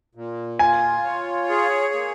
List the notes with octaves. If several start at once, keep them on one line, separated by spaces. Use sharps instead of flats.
A#2
F4 G#5
C#5
G#4
A#3